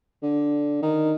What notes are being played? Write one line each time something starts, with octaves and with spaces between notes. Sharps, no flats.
D3
D#3